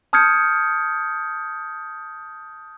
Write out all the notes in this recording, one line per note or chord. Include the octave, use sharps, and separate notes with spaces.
A5 D#6 F6 G6 G#6 C#7